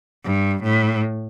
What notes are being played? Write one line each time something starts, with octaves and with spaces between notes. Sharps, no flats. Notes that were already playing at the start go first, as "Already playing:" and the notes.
G2
A2